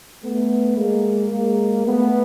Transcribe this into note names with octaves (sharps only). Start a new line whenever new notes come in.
A3 B3
G#3 A#3
G#3 A#3
A3 B3